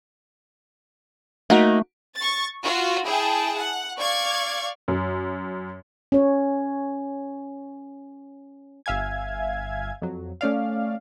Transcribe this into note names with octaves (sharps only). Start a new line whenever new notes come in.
A3 A#3 D#4 F#4
C#6 A6
F4 F#4
E4 G#4 G5 A5
F#5
D5 F5 C#6 G#6
F#2
C#4 C#5
G1 E5 F5 G#5 G#6
F2 F#3
A3 C#4 D5 F5